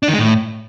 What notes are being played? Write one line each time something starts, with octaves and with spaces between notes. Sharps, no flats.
D4
D#3
G#3
A2